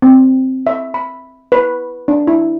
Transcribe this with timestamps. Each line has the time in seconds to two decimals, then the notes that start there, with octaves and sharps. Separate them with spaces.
0.02 C4
0.67 E5
0.94 B5
1.52 B4
2.08 D4
2.27 E4